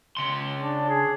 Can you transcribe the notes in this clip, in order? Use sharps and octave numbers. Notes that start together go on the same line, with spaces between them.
C#3 C6
D4
G#4